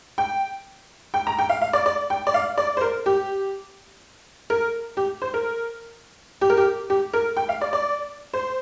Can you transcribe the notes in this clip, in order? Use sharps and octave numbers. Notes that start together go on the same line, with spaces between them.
G5
G5
A#5
G5
F5
F5
D5
D5
G5
D5
F5
D5
C5
A#4
G4
A#4
G4
C5
A#4
G4
A#4
G4
G4
A#4
G5
F5
D5
D5
C5